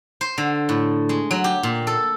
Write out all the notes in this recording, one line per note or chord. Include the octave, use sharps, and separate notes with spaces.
C5
D3
A2
G#3
F#3
G4
A#2
A4